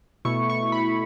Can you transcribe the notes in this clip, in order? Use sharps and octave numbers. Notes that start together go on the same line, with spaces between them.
B2 A3 E4 C#6
C#6
B5